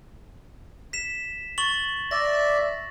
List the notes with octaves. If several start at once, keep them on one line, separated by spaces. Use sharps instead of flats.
B6 E7
C#6 A6 F#7
D5 E5 A#6